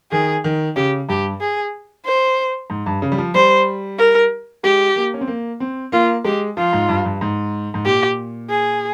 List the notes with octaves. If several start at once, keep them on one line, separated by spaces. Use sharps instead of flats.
D#3 G#4
D#3
C#3 G4
G2 G4
G#4
C5
G#2
G2
C#3
G3
F3
G3 C5
A#4
G#3 G4
A#3
C#4
C4
A#3
C4
A#3 F4
G#3 G4
F3 F4
G#2
G2
G2
G#2
G#2
A#2 G4
G#4